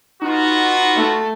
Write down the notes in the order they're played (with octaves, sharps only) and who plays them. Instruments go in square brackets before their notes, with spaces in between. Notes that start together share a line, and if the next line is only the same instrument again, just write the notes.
[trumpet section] B3 F4 F#4 [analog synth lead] D#4
[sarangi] A3